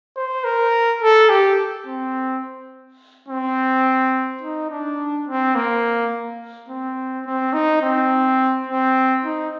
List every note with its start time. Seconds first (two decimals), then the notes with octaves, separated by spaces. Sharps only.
0.16 C5
0.44 A#4
1.02 A4
1.30 G4
1.87 C4
3.29 C4
4.42 D#4
4.70 D4
5.27 C4
5.56 A#3
6.69 C4
7.26 C4
7.53 D#4
7.82 C4
8.67 C4
9.24 D#4